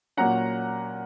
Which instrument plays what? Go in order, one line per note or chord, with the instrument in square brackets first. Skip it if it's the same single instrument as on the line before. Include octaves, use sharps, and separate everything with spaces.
[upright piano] A#2 F#3 A#3 C#4 F#5 A#5